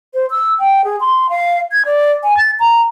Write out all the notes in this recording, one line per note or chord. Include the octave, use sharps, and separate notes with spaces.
C5
E6
G5
G#4
C6
F5
G#6
D5
G#5
A6
A#5